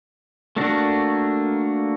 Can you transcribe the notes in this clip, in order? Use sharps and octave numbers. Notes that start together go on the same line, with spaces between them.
A3 A#3 D4 F#4